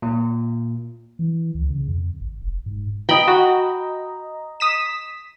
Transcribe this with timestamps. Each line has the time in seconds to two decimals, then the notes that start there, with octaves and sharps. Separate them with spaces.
0.02 A#2
1.19 E3
1.55 C#2
1.70 C#3
1.88 F2
2.21 G#1
2.42 E1
2.66 G#2
3.09 D#5 G5 A#5 B5
3.28 F#4
4.60 D#6 B6 E7